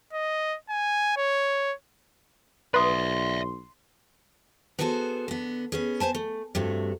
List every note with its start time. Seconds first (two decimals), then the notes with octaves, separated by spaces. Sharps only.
0.13 D#5
0.69 G#5
1.17 C#5
2.74 B1 B4 D5 E5 C6 D#6
4.79 B3 F#4 G#4 A4 B4 C5
5.28 D3 B3
5.72 B3 C#4 G#4
6.00 B3 C5 G#5 A5
6.15 A3
6.55 G2 C3 A3 F#4